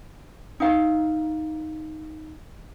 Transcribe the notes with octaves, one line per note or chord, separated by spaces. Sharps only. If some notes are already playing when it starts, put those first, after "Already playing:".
D#4 F5